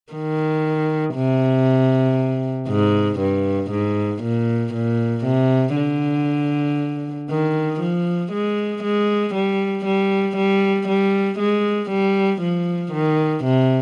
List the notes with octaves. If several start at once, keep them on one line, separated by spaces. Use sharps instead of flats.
D#3
C3
G#2
G2
G#2
A#2
A#2
C3
D3
D#3
F3
G#3
G#3
G3
G3
G3
G3
G#3
G3
F3
D#3
C3